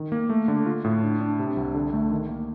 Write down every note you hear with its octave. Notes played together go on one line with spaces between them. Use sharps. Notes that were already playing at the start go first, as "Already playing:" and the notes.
Already playing: D#3
A#3
A3
D3
F4
A2
D4
D4
C3
C2
D3
A3
D#3
A#3